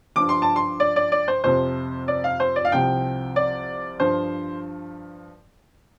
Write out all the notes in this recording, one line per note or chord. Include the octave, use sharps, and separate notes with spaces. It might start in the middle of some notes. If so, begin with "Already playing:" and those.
G2 F3 D6
C6
A5
C6
D5
D5
D5
C5
F2 C3 F3 C5
D5
F5
C5
D5
F5
C2 C3 F3 G5
D5
G2 F3 C5